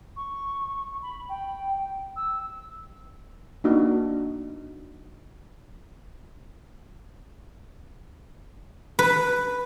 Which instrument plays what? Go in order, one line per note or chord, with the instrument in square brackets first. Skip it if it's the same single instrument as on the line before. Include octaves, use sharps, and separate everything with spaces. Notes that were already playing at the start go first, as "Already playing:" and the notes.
[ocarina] C#6
B5
G5
E6
[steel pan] A#3 D4 D#4 F#4
[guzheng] B4